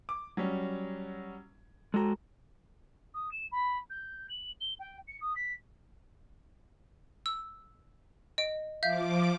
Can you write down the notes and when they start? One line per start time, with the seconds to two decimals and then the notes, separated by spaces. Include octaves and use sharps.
0.09 D6
0.37 F#3 G3 C#4
1.94 G#3 F#4 A4 A#5
3.14 D#6
3.31 E7
3.51 B5
3.90 G6
4.29 F#7
4.60 G7
4.79 G5
5.07 C#7
5.21 D#6
5.35 B6
7.26 E6
8.38 D#5 D7
8.83 F3 E5 F5 D6 G6